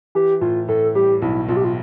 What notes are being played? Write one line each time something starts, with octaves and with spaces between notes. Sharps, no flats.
E3 G4
A2 F4
A2 A4
G3 G4
B1 E4
B1 F4
G4
F4